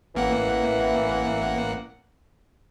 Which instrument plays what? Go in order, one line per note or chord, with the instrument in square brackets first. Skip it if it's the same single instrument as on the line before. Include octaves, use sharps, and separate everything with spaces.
[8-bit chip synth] A1 A#3 F#5 [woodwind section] E3